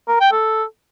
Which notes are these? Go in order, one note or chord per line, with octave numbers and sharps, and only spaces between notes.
A#4
G5
A4